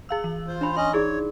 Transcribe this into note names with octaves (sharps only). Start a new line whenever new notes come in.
G#4 F5 E6
E3
F4 C5
D4 C#5 B5
C#4 D#5 C6
D#4 E4 G#4 C#5 D5